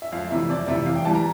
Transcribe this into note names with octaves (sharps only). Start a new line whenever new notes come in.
E5
F2 F5
C3 E3 E5
F2 D5
C3 E3 E5
E2 F5
G5
E3 G3 A5
A#5